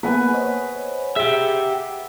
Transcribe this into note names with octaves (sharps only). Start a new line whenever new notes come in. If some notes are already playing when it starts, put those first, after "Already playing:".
A#3 B3 A#4 B4 F#5 G#5
C5 C#5 D#5
G4 G#4 E5